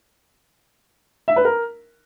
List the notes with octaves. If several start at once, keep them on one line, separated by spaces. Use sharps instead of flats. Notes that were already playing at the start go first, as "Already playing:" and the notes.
E5
B4
A#4